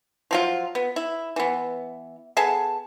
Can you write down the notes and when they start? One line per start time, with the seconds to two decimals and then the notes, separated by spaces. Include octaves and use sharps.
0.31 F3 F#3 F4
0.75 B3
0.96 E4
1.36 E3 B3
2.37 B3 G#4 A4 A5